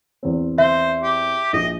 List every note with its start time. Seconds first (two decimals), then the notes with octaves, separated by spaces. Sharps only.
0.23 E2 C4
0.58 C5 E5
1.03 G4
1.53 A#1 D#5